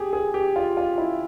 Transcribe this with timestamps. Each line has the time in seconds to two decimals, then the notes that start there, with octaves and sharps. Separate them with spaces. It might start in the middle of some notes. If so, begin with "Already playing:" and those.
Already playing: G4 G#4
0.13 G#4
0.34 G4
0.56 F4
0.77 F4
0.98 E4